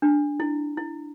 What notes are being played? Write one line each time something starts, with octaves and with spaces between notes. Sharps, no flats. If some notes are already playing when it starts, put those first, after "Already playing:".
D4
E4
E4